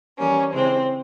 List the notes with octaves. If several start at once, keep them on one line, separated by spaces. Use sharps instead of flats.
E3 G3 A#3 C#4
C#3 E3 G#3 C4